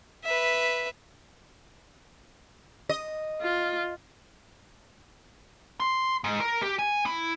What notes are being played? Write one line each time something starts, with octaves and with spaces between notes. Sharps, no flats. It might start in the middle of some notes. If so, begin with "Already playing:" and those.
B4 E5
D#5
F4
C6
G#2
A#4
G4
G#5
E4